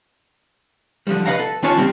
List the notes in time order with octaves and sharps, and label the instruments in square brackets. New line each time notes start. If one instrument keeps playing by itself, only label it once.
[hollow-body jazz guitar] D3 F3 G3
B4 D5 D#5 F5 F#5 A#5
A4
D#3 C#4 D4 F4 C#5 A5
G3 A#3 C4 G4